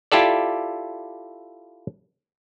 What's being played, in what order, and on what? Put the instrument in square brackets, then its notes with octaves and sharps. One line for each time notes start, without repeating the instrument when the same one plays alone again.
[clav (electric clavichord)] E4 F4 G4 A4 D5